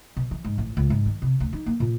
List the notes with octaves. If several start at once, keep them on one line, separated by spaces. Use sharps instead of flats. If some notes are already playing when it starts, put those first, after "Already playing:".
B2
E3
G#2
A1
C#2
G#2
D#3
C3
D2
D#4
A#3
A#2